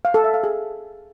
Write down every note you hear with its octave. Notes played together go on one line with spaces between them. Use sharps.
F5
A4
E5
F5
G#4